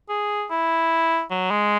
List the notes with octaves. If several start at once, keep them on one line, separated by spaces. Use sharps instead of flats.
G#4
E4
F#3
G#3